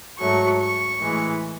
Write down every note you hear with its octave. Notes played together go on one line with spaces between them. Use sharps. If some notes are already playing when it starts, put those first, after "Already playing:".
G#2 F#3 A3 C#6
C#6
A2 E3 G#3